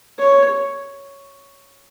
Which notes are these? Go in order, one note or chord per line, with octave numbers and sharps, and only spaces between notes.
C#5